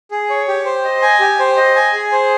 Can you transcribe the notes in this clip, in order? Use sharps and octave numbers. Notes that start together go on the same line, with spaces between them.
G#4
C#5
G4
C5
D#5
G#5
G4
C5
D#5
G#5
G#4
C5